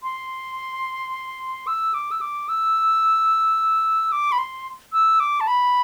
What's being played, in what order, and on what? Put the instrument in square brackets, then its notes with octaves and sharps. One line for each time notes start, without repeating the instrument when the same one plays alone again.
[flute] C6
E6
D6
E6
D6
E6
D6
B5
C6
E6
D6
A5
B5